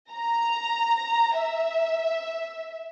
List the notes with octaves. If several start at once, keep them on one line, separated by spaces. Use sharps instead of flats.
A#5
E5